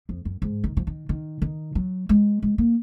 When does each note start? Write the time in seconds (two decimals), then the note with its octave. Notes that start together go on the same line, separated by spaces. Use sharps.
0.09 F2
0.25 F#2
0.42 G#2
0.64 D#3
0.77 F3
0.87 D#3
1.09 D#3
1.42 D#3
1.75 F#3
2.09 G#3
2.42 G#3
2.58 A#3